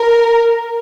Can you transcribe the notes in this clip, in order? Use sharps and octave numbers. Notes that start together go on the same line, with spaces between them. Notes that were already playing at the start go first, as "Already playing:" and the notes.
Already playing: A#4